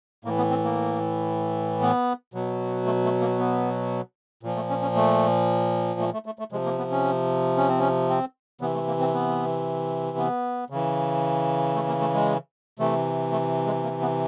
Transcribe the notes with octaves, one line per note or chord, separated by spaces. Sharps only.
A2 E3 A#3
B3
C4
A#3
B3
B2 F#3
A3
A3
A#3
B3
A#2 F3
A3
C#4
C#4
A3
A3
A3
A3
A3
C3 F3 G#3
A#3
B3
C#4
C#4
C4
C#4
C4
C3 E3 B3
A3
A#3
C4
B3
B3
C#3 E3
A3
A#3
A3
G#3
C3 E3 A3
A3
G#3
A#3
B3